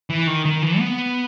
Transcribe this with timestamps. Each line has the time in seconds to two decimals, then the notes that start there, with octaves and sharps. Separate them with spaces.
0.10 E3
0.27 D#3
0.45 D#3
0.62 E3
0.79 B3